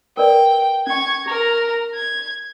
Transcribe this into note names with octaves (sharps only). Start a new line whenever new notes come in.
A#4 B4 D5 G5
C#4 G#5 C#6 G#6
G#4 A#4 A#5
G#6